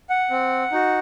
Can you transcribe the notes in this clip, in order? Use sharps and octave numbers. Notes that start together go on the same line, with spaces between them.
F#5
C4
D#4 F#4